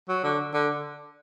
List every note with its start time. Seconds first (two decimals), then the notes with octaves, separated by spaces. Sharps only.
0.09 F#3
0.24 D3
0.54 D3